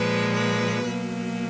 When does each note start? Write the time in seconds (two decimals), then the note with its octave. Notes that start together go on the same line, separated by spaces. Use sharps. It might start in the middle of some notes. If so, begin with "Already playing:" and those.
Already playing: A#2 F3 G#3 B4
0.32 B4
0.85 B2 F#3 A#3